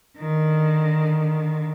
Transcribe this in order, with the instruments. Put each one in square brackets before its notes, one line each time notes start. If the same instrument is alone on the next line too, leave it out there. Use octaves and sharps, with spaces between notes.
[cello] D3 D#3